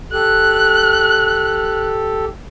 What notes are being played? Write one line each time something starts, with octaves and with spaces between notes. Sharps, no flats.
G4 A4 F#6